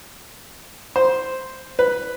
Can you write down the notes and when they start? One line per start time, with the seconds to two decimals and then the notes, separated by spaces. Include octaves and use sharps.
0.96 C5
1.79 B4